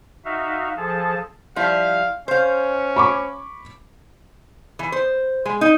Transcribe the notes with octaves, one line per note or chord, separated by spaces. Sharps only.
D#4 F#4 E5 F5
F3 G#4 A4 A5
F3 G3 E4 F5
C#4 C5 F5
B5 C#6 D6
E3
C5
G#3
D#4